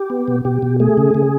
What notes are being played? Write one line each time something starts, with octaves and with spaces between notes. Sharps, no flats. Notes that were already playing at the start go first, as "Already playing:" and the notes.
Already playing: G4
B3
B2
B2 G4
B2
A3 G#4
C#3
C#3